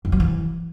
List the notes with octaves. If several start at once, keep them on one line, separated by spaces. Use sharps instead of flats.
F2
F#3
E3